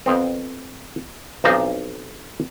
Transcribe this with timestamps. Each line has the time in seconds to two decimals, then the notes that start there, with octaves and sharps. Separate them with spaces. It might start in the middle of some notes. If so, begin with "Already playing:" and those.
0.06 F2 B3 C4
1.44 B1 F3 C4 D4 D#4 D#5